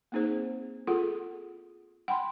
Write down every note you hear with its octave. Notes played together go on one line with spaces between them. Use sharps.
A#3 C4 D#4 G#4 C5
F4 G#4 A4 F#5
F#5 G5 B5 C6